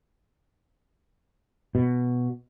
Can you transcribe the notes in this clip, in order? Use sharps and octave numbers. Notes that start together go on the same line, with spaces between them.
B2